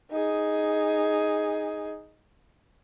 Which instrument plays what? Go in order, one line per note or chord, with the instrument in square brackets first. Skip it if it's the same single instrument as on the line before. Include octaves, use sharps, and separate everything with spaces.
[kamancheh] D#4 G#4